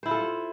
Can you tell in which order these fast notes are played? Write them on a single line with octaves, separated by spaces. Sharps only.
C5 E4 F4 A4